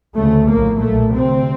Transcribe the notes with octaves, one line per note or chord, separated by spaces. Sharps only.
D2 C#3 A3
A#1 A2 A#3
B1 A#2 A3
D2 C3 C4